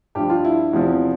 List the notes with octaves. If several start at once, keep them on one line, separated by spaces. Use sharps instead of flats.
G2 F3 G4
F4
E4
E2 C3 F3